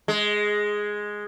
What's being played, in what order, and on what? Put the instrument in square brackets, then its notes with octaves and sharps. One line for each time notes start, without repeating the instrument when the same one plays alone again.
[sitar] G#3